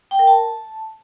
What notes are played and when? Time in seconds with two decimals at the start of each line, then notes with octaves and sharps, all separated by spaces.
0.11 G5
0.19 A#4
0.27 A5